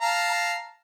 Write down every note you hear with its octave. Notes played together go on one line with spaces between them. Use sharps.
F5 A5 A#5